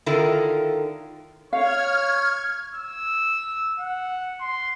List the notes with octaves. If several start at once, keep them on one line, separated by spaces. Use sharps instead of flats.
D3 D#3 E4 F4 A4 A#4
C#5 F5 F6 G#6
E6
F#5
C6